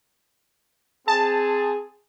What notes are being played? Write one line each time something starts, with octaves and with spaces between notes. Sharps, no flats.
C4 G#4 A5